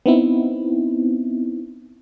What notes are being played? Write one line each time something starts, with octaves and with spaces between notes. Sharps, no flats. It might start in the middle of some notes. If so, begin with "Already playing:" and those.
B3 C4 D#4 E4